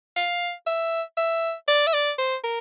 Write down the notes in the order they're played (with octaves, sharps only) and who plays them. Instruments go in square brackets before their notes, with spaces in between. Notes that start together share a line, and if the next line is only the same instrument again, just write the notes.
[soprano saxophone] F5
E5
E5
D5
E5
D5
C5
A#4